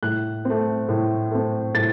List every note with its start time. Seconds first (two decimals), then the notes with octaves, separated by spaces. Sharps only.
0.03 A2 F#6
0.45 A3 C4
0.89 A2
1.31 A3 C4
1.75 A2 A6